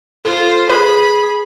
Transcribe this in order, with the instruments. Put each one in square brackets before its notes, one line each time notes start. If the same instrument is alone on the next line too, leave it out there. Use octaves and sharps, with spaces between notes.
[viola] F4 [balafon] A4 [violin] C5
[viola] G#4 [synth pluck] B4 [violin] B5